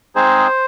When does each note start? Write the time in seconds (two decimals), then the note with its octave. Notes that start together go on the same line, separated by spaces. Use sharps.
0.15 G#3 C4 D#4 G#4 C5